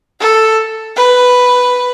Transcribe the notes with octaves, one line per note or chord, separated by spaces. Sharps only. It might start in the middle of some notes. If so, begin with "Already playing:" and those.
A4
B4